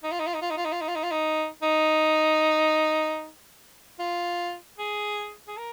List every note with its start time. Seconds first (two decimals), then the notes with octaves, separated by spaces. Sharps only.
0.04 D#4
0.12 F4
0.19 D#4
0.27 F4
0.34 D#4
0.42 F4
0.50 D#4
0.57 F4
0.65 D#4
0.72 F4
0.81 D#4
0.88 F4
0.95 D#4
1.03 F4
1.11 D#4
1.62 D#4
3.99 F4
4.78 G#4
5.47 G#4
5.58 A#4